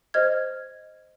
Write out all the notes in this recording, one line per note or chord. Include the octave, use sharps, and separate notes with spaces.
C5 D#5 F6 G#6